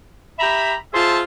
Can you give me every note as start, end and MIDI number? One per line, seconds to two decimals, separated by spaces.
0.39 0.74 67
0.39 0.74 76
0.39 0.74 82
0.39 0.74 83
0.93 1.20 65
0.93 1.20 68
0.93 1.20 72
0.93 1.20 76
0.93 1.20 81